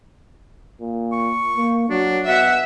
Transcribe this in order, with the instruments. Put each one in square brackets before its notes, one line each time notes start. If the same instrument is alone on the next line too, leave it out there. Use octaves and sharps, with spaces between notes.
[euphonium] A#2
[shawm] C#6
[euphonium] A#3
[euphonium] F#3 [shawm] D4
[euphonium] B2 [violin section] E5 [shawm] F#5